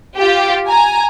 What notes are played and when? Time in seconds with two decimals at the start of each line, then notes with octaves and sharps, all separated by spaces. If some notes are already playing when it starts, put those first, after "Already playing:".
0.18 F4 G4
0.69 G#5 A#5